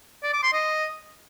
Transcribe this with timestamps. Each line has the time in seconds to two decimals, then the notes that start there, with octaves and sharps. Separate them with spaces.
0.23 D5
0.33 D6
0.43 C6
0.53 D#5